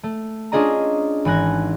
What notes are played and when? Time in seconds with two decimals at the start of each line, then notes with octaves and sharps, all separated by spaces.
0.03 A3
0.52 C#4 D4 F4 G#4 D#5 A#5
1.25 G#1 E3 G#5 F#6 A#6